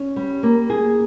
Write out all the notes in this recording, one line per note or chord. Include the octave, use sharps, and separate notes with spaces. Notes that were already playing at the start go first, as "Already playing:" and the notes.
Already playing: C#4
G3
A#3
G#4